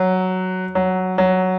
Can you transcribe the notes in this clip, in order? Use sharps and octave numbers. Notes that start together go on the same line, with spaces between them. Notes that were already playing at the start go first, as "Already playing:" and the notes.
Already playing: F#3
F#3
F#3